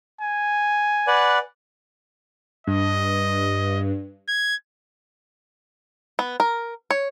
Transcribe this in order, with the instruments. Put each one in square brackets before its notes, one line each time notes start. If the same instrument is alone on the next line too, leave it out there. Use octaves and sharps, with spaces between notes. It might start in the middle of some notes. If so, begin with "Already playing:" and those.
[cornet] G#5
[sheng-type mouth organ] B4 D5 F#5
[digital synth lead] G2 [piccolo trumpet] D#5
[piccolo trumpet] G#6
[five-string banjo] B3
A#4
C#5